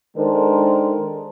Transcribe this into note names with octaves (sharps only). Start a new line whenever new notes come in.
D#3 G#3 D4 A4 A#4 C5